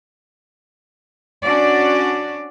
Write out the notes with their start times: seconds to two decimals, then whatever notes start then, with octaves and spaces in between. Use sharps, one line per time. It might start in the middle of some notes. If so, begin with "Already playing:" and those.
1.42 C#4 D4 F#4 D5